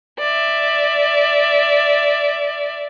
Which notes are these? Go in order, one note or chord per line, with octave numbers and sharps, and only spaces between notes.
D5 E5